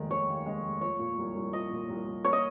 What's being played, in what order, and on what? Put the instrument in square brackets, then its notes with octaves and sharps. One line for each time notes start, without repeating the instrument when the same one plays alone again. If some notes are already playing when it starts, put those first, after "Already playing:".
Already playing: [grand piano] F1 D#2 D#3 G#3
[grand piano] D#3 [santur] C#5
[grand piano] D#2
G#3
F1
[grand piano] F3 [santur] C#5
[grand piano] A#2
C2
C2
[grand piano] F3 [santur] D#5
[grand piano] A#2
C2
C2
[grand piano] A#3 [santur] C#5
[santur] D#5